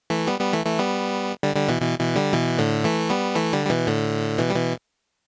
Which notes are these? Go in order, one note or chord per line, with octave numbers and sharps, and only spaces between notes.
E3 A3
G3 B3
G3 B3
E3 A3
E3 A3
G3 B3
D3 G3
D3 G3
B2 E3
B2 E3
B2 E3
D3 G3
B2 E3
A2 D3
E3 A3
G3 B3
E3 A3
D3 G3
G3
B2 E3
A2 D3
B2 E3
G3
B2 E3